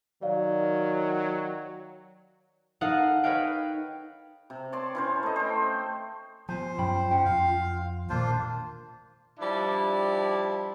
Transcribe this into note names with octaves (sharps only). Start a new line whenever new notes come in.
D#3 F#3 D5 F5
D#4 A4 A#4 D#5 F5 F#5
B4 C#5 D#5 F5 G5
C3
C#5 D5 A5 C6
E3 C#4 C5
A3 D#5
C5 G5
F3 B3 F4 C5 G#5
F#2 C#4 G5 B5
C#4 F#5 G5
F2 F5
E1 A#2 D#3 A#3 D4 F4 C5
F3 G3 D4 E4